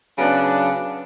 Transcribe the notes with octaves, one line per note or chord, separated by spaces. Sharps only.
C#3 F#3 B3 D4